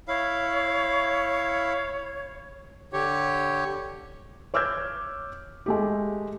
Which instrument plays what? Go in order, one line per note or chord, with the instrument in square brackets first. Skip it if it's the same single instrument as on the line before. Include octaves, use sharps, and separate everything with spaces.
[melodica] E4 F5 [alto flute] C#5
[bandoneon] D3 G4 C#5
[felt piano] C#5 D6 E6 F6 G6 G#6
G#3 A3 G4